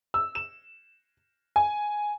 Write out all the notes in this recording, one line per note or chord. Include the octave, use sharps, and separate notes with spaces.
E6
E7
G#5